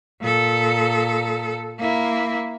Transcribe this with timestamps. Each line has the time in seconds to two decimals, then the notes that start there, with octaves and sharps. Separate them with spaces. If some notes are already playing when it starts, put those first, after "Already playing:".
0.22 A#2 A4
1.79 A#3 E4